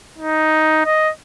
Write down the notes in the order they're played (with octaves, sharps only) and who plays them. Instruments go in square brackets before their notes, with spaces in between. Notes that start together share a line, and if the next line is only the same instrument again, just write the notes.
[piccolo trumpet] D#4
D#5